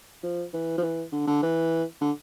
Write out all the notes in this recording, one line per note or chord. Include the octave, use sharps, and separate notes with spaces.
F3
E3
F3
E3
D3
D3
E3
D3